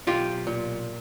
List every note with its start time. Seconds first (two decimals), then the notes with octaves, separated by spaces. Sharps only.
0.07 B1 F4 G4
0.47 A#2